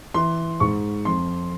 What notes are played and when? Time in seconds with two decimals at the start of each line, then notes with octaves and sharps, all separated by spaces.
0.14 E3 C6
0.60 G#2 C#6
1.05 F2 C6